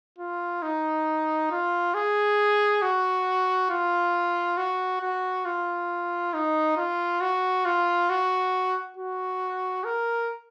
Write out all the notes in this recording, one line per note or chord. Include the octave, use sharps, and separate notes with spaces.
F4
D#4
F4
G#4
F#4
F4
F#4
F#4
F4
D#4
F4
F#4
F4
F#4
F#4
A#4